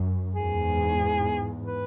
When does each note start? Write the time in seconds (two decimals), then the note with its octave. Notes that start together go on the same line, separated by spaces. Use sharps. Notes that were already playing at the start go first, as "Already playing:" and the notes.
Already playing: F#2
0.35 E2 G#2 G#4
1.65 B4